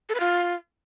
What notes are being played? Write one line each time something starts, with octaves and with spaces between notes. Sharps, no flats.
A4
B4
F4